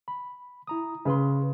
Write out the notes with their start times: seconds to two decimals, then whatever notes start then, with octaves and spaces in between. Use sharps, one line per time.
0.08 B5
0.67 E4 A#5 D#6
1.05 C#3 G#4 B4 C6